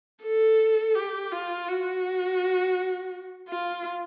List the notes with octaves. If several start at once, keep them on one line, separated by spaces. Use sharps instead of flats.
A4
G4
F4
F#4
F4